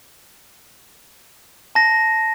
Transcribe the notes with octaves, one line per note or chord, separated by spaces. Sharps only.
A5 A#6